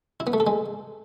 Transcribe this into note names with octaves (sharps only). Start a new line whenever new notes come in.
E4
B3
A3
A4
G#3